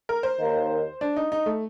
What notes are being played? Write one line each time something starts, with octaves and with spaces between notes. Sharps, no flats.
A#4
C5
D#2 D#3 A#3 D#4 A#4
D4
D#4
D#4
A3